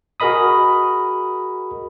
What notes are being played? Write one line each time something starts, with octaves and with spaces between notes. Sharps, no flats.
F#4 G#4 A#4 D#5 B5 D#6